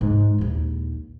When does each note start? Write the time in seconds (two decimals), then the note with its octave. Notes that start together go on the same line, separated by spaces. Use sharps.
0.01 G#2 D#4
0.38 A#1 D#2